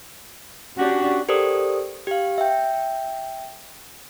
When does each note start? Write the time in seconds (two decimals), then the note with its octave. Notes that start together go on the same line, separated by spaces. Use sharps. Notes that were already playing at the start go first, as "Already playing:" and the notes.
0.78 C#4 D4 F#4 G4
1.29 G4 A4 A#4 C5 D5 D#6
2.07 G4 F5
2.38 E5 G5